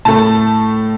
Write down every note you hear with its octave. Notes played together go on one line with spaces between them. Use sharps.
A2 A3 A5